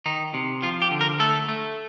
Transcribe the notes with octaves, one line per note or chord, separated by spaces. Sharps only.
D#3 D#4
C3
F3 F4
G4
D3
A#4
A3 A4
A3